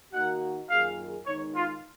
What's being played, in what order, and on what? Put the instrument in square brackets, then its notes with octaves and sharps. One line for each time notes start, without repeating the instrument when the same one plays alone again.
[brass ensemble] D#3 A#3 D#4 F#4 [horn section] F#5
[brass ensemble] F#2 D#3 A#3 F4 G#4 [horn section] F5
[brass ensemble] D#3 G#3 B3 D#4 [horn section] C#5
[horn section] F4